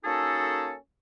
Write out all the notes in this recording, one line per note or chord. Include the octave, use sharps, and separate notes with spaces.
A#3 C#4 D#4 F#4 G#4 A4